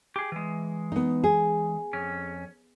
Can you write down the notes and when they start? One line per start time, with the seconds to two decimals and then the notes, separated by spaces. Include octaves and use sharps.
0.16 G4 G#4
0.32 E3 G#3
0.92 B3 D#4
1.24 G#4
1.93 F2 C#4